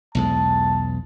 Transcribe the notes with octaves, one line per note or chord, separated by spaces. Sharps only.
B1 E2 G#3 A5